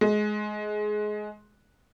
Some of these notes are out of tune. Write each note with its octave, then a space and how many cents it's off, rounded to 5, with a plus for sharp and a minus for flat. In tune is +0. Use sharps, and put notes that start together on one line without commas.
G#3 +20